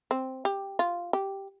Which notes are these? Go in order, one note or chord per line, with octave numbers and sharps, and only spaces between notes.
C4
G4
F4
G4